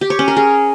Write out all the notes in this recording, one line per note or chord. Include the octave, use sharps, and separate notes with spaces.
G4
C#5
C#4
A#4
G#4